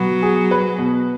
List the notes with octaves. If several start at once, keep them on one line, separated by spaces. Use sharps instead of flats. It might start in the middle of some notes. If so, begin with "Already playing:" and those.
Already playing: B2 F#3 B3
G#4
B4
B2